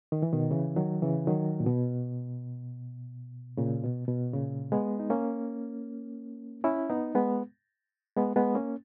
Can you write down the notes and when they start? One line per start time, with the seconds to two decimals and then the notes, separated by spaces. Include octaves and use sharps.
0.12 D#3
0.22 E3
0.33 B2 D#3
0.51 C#3 E3
0.76 D#3 F#3
1.02 C#3 E3
1.27 D#3 F#3
1.60 A#2
1.66 B2
3.57 A#2 C#3
3.83 B2
4.08 B2
4.34 A#2 C#3
4.72 G#3 B3
5.00 D#4
5.10 A#3 C#4
6.64 C#4 E4
6.90 B3 D#4
7.15 G#3 B3
8.17 G#3 B3
8.36 G#3 B3
8.55 A#3 C#4